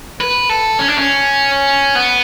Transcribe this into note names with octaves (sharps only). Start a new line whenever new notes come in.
B4
A4
C#4
D4
C#4
B3